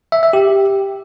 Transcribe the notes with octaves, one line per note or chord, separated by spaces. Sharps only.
E5
E5
G4